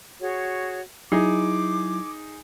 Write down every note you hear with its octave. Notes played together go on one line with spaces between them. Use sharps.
F#4 G#4 C#5
F#3 D#4 E4 G#4 D6